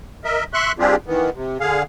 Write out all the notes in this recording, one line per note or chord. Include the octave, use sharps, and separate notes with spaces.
A#4 D#5 E5
E5 C6 C#6 F#6
G3 C4 D4 F4 G4 G#4
D#3 E3 B3
C3
D3 G#4 F5